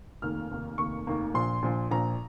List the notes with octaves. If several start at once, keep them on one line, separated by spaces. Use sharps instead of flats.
F1 D#2 D#3 A#3 F6
F1 D#2 D#3 A#3
F1 D#2 D#3 A#3 C#6
F1 D#2 D#3 A#3
A#1 A#2 F3 C6
A#1 A#2 F3
A#1 A#2 F3 A#5